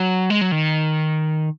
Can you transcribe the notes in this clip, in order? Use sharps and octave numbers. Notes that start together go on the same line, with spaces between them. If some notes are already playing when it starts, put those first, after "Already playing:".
Already playing: F#3
G#3
F#3
D#3